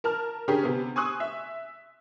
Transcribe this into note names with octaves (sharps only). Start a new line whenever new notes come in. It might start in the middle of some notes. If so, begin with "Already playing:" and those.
A#4 A5 F6
D3 C#4 G4 G#4 A#4
C3 B3
G#5 C6 C#6 D#6 E6 F#6
E5